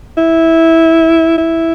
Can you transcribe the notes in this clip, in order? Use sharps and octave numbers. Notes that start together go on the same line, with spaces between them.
E4
E4